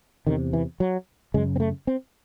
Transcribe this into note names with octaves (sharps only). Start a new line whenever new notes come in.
E2 C3 D#3
E3
F#3
F#2 C#3 G#3
C4
A3
C4